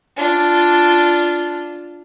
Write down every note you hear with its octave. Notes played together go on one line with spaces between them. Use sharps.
D4 F4